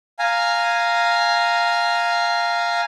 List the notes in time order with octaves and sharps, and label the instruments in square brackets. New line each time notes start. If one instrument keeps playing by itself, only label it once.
[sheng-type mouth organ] F5 G#5 A#5